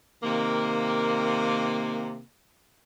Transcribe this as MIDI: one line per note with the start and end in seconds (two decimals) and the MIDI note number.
0.23 2.21 48
0.23 2.21 51
0.23 2.21 58